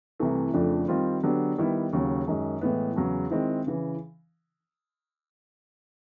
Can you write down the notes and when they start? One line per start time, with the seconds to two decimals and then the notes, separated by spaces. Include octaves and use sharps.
0.20 C2 C3 E3 A3
0.54 F2 C#3 F3 A3 D4
0.88 D#3 G3 C4 F4
1.23 D3 F#3 B3 D4 G4
1.58 D#3 G3 B3 E4
1.93 D#2 C#3 F#3
2.28 F#2 D#3 G#3
2.61 A2 E3 G#3 B3
2.96 E2 C#3 F#3
3.30 D#3 G#3 C4 E4
3.67 C#3 E3